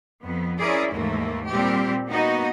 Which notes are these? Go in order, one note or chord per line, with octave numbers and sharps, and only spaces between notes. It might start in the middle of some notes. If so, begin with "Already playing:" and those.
F2 B3
C#4 E4 G#4 A#4 D5
D#2 G#2 E3 A3 A#3
A#2 G3 C4 G4
A#3 B3 D#4 F#4 D#5